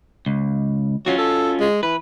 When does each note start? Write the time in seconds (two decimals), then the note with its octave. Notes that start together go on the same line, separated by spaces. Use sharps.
0.26 C#2
1.06 F#3 C#4 F4 F#4
1.18 A4
1.60 G#3
1.83 E3 B4